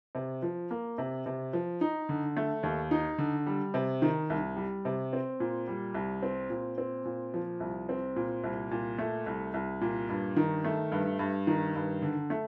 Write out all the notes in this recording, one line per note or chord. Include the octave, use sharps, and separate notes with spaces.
C3
F3
A#3
C3
C3
F3
D#4
D3
A3
D#2
D#4
D3
G3
C3
D#3
C2
G3
C3
C4
A#2
G3
C2
C4
A#2
C4
A#2
F3
C2
C4
A#2
C2
A#2
A3
C2
C2
A#2
G2
D#3
A3
G2
G2
D#3
G2
D3
A3